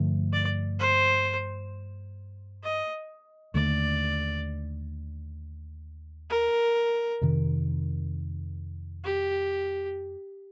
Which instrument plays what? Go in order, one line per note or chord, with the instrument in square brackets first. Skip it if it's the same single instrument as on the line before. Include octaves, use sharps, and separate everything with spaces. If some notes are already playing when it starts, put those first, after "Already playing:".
Already playing: [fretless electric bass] G2 D3 F3 A3
[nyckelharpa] D5
C5
D#5
[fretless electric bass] D#2 D3 A3 [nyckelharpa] D5
[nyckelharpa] A#4
[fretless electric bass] F2 C3 D#3
[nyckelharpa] G4